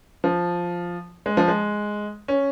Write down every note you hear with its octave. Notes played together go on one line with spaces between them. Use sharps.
F3
G#3
F3
G#3
C#4